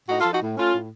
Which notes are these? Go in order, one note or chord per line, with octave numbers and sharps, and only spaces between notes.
A2 D#4 F#4
F4 A4
F3
D#4 F#4
A2
A3 C#4 F4
A2